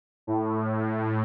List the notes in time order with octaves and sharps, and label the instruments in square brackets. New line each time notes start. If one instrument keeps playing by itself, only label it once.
[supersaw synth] A2